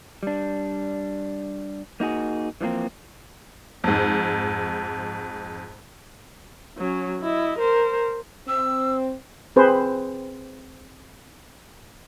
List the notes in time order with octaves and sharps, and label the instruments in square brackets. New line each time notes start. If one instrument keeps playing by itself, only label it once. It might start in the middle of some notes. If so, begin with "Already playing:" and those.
[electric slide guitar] G3 D4
A#3 D#4 F#4 G#4
E3 F3 G3 A#3 C4
[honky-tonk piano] F2 G#2
[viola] F#3 C#4
E4 D#5
A#4 C5
[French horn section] C4 [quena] E6
[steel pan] C4 G#4 B4 C5